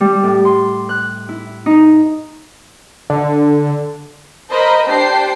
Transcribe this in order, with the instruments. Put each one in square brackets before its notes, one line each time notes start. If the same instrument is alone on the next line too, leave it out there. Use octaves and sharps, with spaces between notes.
[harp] G3
A2
C6
F#6
E4
D#4
[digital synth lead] D3
[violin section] A#4 C5 D#5 B5
D4 G4 C5 G5 C7